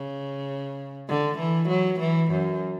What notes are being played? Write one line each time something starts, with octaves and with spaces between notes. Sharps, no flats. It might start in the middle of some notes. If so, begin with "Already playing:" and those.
Already playing: C#3
D3
E3
F#3
E3
F#2